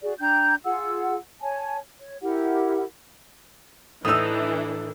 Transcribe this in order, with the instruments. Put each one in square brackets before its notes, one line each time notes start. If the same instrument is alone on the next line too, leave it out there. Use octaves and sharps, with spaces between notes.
[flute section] F#4 G#4 D5
D4 G5 A#5 G6
F4 G#4 F#5 E6
C#5 G#5 A5
C#5
E4 G4 A#4 F#5
[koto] A2 D#4 [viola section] E3 D4 [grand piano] D#6 E6